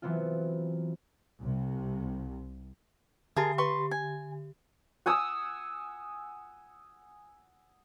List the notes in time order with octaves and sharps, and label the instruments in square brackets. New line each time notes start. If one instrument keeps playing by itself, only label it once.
[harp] E3 F#3 B3 C4 F4
[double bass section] C2 C3
[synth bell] D3 G4 [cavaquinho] G#4 A#4 A5
[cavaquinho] B4 C6 C#6
G#5
[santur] F#5 G#5 D#6 E6